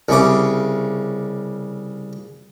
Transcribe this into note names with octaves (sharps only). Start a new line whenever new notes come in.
C2 C#3 D6